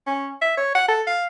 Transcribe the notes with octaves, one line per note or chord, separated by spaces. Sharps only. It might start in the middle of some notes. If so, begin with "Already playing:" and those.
C#4
E5
C#5
F#5
A4
F5